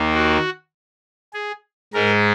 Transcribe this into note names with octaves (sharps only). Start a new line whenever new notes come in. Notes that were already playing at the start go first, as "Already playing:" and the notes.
Already playing: D#2 D#3 A#3
F#4
G#4
G#2 G#3 A#4